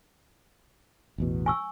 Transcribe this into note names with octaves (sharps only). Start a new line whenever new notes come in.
A1 E2 B2
G#5 C#6 E6